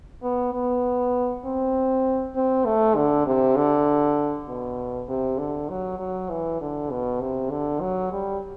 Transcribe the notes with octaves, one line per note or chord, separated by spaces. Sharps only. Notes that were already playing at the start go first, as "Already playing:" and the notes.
B3
B3
C4
C4
A3
D3
C3
D3
B2
C3
D3
F#3
F#3
E3
D3
B2
C3
D3
F#3
G3